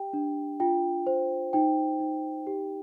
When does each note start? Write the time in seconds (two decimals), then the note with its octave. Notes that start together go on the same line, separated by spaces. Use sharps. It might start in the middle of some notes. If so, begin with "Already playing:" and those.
Already playing: G4 G5
0.13 D4
0.60 F4 G5
1.07 C5
1.53 D#4 G5
2.00 D#4
2.47 G4